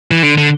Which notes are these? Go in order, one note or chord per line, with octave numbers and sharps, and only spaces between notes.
E3
D3
D3